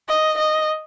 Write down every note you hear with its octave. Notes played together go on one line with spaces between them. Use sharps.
D#5
D#5